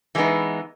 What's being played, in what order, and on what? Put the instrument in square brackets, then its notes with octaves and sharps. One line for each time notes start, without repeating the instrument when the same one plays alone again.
[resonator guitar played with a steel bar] E3 G#3 B3 D#4